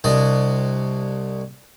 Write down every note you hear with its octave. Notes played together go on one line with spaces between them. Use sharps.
C2 D4 D#5